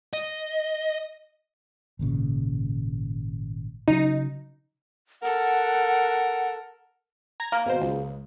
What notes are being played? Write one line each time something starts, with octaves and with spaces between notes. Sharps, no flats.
D#5
G#1 A#2 C#3
C#3 F#3 D#4
A4 A#4 F#5
A#5 G#6 A#6
A#3
G#1 B2 C5
C#2